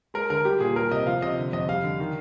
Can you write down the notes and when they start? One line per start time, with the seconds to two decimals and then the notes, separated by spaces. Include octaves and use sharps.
0.14 G#3 A#4
0.30 D3 A#4
0.45 G3 G4
0.60 A#2 G#4
0.76 G3 A#4
0.91 C3 D#5
1.07 F3 F5
1.22 C3 D#5
1.37 D3
1.53 F2 D#5
1.69 G3 F5
1.83 D3
2.00 D#3